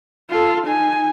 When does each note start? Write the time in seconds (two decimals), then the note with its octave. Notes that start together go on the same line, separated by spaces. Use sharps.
0.30 F4 A4
0.67 D#4 G#5